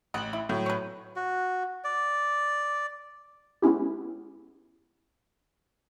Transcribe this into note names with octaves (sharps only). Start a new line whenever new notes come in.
A1 D#5 F#5 F#7
E4
A2 F#3
B4 C#5
F#4
D5
G#3 B3 C#4 E4 G4